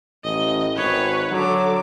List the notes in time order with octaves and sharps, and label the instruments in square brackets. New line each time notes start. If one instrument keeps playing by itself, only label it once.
[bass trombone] A1 [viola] D#5
[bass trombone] G#1 [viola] B4 C#5
[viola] D3 D6 [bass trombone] F#3